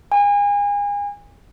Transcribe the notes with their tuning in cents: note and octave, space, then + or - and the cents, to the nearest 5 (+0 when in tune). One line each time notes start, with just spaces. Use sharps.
G#5 -35